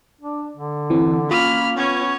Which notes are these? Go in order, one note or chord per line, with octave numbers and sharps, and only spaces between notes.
D4
D3
E3 C4
A#3 C#4 F4 B5 F6
B3 C#4 C#5